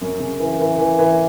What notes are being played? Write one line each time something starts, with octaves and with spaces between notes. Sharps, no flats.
F#2
C#3
E3
E3
E3
E3